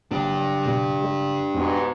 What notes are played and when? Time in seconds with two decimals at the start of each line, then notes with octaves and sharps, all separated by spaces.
0.11 F#1 G2 D4 G4
0.66 F#2 B2 G3
1.01 G3 G#3
1.54 F2 G#2 B2